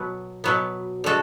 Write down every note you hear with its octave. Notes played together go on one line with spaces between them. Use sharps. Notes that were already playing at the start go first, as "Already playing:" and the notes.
Already playing: B2 F#3 B3
B2 F#3 B3
D3 G#3 F#4 A4